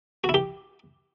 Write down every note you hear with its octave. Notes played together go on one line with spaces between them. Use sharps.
F#4
E4
G4